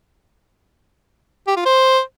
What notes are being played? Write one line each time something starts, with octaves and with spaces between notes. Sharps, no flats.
G4
F4
C5